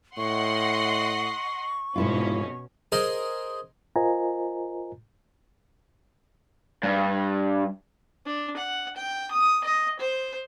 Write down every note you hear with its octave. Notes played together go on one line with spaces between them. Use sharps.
A2 D#5 F#5 C6 C#6
F1 G#2 B2 C#4 E4 F4
G#4 A#4 C5 D#5
F4 A#4 C5 D#5 G#5 A#5
G2
D4
F#5
G5
D#6
D#5
C5